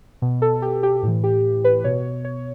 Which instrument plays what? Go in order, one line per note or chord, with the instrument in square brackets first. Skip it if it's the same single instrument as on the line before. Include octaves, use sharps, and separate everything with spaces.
[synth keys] B2
A4
G4
G4
A2 E3
G4
B4
B2 C#5
C#5